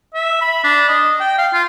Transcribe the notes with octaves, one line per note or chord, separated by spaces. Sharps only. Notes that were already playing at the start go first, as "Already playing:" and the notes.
E5
B5
D4
D#5
G5
F5
F4